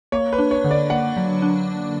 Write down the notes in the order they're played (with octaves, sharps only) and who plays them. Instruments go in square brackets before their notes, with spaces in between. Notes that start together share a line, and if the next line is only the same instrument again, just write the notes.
[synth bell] A#3 [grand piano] C#5
[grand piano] B4
[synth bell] D4
[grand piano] C#5
[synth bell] D3
[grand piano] D5
[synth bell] A#3 [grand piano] F#5
[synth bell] F#3
D4